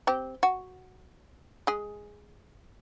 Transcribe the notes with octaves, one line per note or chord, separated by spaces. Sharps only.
C4 G4
F#4
G#3 G#4